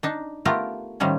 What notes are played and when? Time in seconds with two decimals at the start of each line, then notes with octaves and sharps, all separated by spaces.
0.03 D4 D#4 A5
0.45 A3 B3 F4 G4 A#4
1.00 A2 D#3 F3 G3 C#4